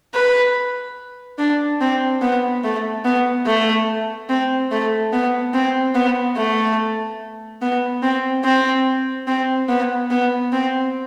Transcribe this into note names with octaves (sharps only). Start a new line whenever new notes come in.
B4
D4
C4
B3
A3
B3
A3
C4
A3
B3
C4
B3
A3
B3
C4
C4
C4
B3
B3
C4